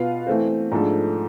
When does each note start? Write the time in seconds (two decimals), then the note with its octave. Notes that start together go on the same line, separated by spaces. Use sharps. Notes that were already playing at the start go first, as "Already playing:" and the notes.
Already playing: B2 B3 F4 B4 F5
0.27 E3 A3 C4
0.71 G#2 F3 A3 D4 A4